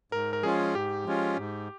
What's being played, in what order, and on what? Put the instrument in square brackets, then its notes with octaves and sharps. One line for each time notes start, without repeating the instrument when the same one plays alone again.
[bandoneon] G#2 [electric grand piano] A#4
[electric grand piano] A#4
[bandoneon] F3 G#3 C#4 F4 [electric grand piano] G#4
[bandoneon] G#2 [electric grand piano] G4
[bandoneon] F3 G#3 C#4 F4
G#2